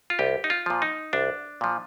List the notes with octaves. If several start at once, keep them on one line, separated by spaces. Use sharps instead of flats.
F4
C2 G4
D#4
F4
A#2 F3
D#4
C2 D4
A#2 F3